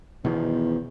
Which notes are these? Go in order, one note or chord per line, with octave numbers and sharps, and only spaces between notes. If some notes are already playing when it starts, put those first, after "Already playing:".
E2 B2 D#3 F3